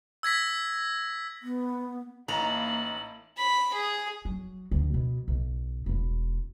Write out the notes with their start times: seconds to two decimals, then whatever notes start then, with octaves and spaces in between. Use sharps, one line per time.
0.23 E6 G#6 A#6 B6
1.42 B3
2.28 A1 A#3 D#4 E4 A5 A#5 F#7
3.37 B5
3.74 G#4
4.25 F#3
4.71 D2
4.94 B2
5.28 B1
5.86 E1 E4